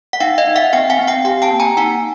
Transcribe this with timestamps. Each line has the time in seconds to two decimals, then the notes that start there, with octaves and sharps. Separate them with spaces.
0.13 F#5
0.20 D#4 F5 G5
0.38 D#5 F5
0.47 D#4
0.56 E5 F#5
0.73 C4 F5 G5
0.90 F#5 G#5
0.99 C4
1.08 F5 G5
1.25 G4 F5 G5
1.42 G5 A5
1.51 A#3
1.60 G#5 A#5
1.77 D#4 F#5 G#5